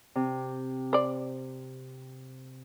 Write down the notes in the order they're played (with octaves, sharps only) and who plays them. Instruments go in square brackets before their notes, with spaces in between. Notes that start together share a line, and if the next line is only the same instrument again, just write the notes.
[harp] C3
[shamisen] C5 D5